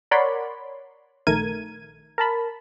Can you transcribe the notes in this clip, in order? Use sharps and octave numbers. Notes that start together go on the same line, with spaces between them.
A#4 C#5 D5 F#5 B5 C6
A#1 D#3 A3 A#4 G#6 D#7
A#4 A5 B5